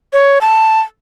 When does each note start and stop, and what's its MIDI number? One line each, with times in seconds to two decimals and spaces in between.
0.13 0.39 73
0.41 0.80 81